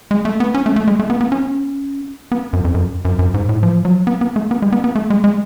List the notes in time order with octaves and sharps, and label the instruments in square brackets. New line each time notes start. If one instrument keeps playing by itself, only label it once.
[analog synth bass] G#3
A3
B3
C#4
A3
A3
G#3
A3
B3
B3
C#4
B3
F#2
F2
F#2
F#2
F#2
G#2
A2
F3
F#3
B3
B3
A3
B3
G#3
B3
B3
A3
G#3
G#3